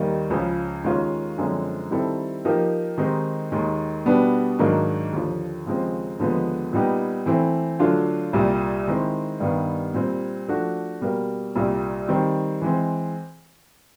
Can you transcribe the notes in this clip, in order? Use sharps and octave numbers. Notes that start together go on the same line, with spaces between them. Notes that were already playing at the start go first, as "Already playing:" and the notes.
Already playing: D#2 D#3 G3 A#3 D#4
C#2 C#3 F3
D#2 D#3 G#3 C#4 F4
F#2 D3 F3 G#3 C4
D#3 G3 C4 E4 A4
F3 A#3 D#4 G4 A#4
D#3 G#3 C4 D#4 G4
D#2 D#3 G#3
B2 G3 B3 D4
G#2 D#3 F#3 A#3 D4
D#2 D3 F3
D#2 C#3 F3 G#3 C4
D#2 D3 F3 G#3 B3
A#2 G3 B3 D#4 G4
E3 A3 C4 E4
D3 F#3 A3 D4 F4
C2 A#2 G3
D#3 G#3 C4 E4
G2 D#3 G3 B3
A#2 G3 C4
F3 A3 D4 F#4
B2 G3 A#3
C2 A#2 G3
D#3 G3 C4
E3 G#3 C4